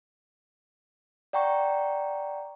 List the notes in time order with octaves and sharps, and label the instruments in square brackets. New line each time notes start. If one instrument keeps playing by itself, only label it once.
[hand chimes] D5 F#5 G5 A#5 C#6